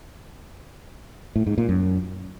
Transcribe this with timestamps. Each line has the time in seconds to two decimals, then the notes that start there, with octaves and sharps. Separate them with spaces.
1.36 A2
1.47 G#2
1.58 A#2
1.69 F#2